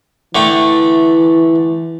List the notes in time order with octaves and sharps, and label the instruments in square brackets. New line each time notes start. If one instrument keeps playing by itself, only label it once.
[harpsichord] D3 A3 G5 [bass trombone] E3